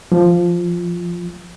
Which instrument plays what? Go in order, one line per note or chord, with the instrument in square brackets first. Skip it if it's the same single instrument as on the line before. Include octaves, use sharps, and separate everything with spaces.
[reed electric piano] F3